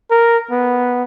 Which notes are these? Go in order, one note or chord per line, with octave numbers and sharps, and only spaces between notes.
A#4
B3